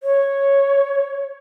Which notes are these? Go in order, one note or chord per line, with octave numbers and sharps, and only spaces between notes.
C#5